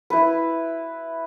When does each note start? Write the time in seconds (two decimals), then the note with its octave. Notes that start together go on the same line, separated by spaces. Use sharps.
0.10 E4 B4